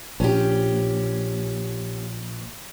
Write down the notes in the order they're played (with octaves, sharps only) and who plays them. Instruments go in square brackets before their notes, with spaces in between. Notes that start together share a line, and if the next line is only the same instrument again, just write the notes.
[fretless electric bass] A#1 [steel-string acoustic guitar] C#4 G4